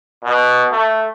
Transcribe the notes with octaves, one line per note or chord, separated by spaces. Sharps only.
B2
A3